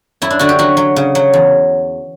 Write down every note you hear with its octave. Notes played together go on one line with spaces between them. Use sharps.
F#2 E4
D4
D3 F#4
G4
F#3 F#4
F#3
C#3
F#3
E2